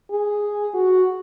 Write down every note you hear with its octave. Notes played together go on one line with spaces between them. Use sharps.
G#4
F#4